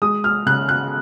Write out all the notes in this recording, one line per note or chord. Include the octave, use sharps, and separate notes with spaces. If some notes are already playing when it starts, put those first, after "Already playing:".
G#3 D#6
F6
C#3 F#6
F#6